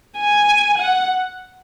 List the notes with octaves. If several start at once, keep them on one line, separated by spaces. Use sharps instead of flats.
G#5
F#5